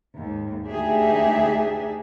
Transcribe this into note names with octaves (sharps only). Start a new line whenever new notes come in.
D#2 G#2
D2 D4 D#4 G4 G#4 E5